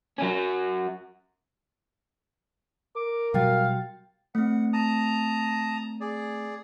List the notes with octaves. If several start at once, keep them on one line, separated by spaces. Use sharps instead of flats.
F#3 C#4
A#4 D6
B2 F#3 G3 F#4 F5 G5 A6
A3 C4 F#5
A5 A#5 D#6
G#4 D5